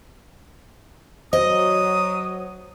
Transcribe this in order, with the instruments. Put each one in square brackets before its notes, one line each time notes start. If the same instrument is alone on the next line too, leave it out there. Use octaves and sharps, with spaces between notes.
[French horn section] F#3 [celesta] C5 [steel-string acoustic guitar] D#5 [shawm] D#6